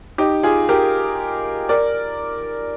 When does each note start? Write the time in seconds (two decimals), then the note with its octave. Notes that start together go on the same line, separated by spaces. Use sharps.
0.18 D#4 G4
0.43 F4 G#4
0.69 G4 A#4
1.69 A#4 D5